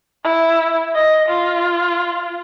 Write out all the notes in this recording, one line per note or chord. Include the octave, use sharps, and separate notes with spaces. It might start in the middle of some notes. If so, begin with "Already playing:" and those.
E4
D#5
F4